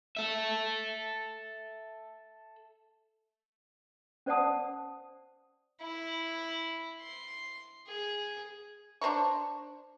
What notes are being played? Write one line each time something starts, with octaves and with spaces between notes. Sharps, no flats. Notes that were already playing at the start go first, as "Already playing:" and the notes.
A4 E5
C#4 C5 D5 F#5 A5 D#6
E4
C6
G#4
D4 C5 A#5 C#6